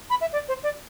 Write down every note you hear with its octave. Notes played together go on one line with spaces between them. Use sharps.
B5
E5
D5
C5
D5